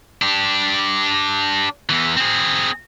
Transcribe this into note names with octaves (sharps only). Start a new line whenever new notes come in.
D4 G4
E2 E3
C4 G#4